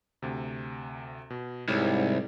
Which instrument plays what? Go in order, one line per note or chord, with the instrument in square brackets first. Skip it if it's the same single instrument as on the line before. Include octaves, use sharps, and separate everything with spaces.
[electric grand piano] D2 C3
B2
[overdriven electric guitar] C2 [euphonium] G#2 [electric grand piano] E4 G4 C#5